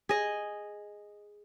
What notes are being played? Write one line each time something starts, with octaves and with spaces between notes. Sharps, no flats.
G#4 D#5